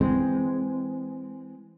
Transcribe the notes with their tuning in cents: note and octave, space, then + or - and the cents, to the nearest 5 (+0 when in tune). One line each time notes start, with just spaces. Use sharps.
E3 +0 G#3 +0 C4 -10